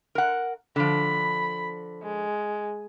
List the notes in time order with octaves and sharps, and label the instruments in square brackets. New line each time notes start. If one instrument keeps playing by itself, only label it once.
[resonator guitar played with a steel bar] A#4 F#5
[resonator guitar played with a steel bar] D3 F3 [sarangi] B5
[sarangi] G#3